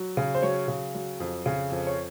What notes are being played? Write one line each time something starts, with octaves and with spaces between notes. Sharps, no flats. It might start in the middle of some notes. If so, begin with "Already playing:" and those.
Already playing: F#3
C#3
C5
F#3 C#5
C#3
F#3
F2
C#3
F2
C#5